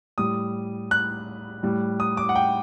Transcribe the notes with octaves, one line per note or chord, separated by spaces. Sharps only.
A2 G3 D#6
F#6
A2 G3
D#6
D6
F#5
G5